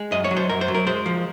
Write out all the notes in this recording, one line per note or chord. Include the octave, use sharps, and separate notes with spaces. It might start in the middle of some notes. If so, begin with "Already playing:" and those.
Already playing: G#3
F#2 D#5
C#5
F#3
C5
F#2 A#4
C5
F#3
A#4
G#3 C5
F3